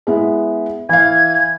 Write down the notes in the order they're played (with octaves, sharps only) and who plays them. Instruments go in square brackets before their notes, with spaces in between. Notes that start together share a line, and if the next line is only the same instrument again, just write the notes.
[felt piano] G#3 B3 E4
[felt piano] E3 F5 [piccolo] G#6